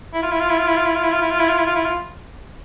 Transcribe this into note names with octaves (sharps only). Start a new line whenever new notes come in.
E4
F4
E4
F4
E4
F4
E4
F4
E4
F4
E4
F4
E4
F4
E4
F4
E4
F4
E4
F4